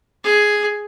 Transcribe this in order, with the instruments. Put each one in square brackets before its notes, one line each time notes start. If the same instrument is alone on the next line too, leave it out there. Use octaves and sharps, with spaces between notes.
[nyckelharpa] G#4